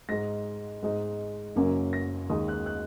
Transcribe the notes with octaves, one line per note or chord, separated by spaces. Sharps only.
G#2 G#3 D#4 A#6
G#2 G#3 D#4
F#1 F#2 F#3 A#3 C#4
A#6
D#2 D#3 G#3 D#4 D#6
F#6
F#6